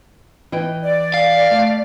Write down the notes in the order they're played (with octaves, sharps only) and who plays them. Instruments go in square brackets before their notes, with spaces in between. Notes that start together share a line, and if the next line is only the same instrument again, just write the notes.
[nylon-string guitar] E3 D#5 G5
[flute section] D5
[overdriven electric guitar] F5
[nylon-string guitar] A3